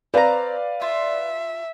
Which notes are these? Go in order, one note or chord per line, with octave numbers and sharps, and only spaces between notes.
C4 B4 D5 F5 A#5
F4 E5